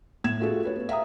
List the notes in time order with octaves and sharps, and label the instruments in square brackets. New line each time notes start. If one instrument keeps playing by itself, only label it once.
[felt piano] A2 G#6 E7
A3 F4 F#4 G#4 A4
G4 B4 C#5
B3
E5 F5 A#5 D#6